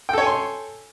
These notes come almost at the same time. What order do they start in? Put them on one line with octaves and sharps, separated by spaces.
G5 A4 C#5 G#5 C6